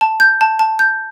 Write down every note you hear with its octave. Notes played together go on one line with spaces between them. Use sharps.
A5
G6
A5
A5
G6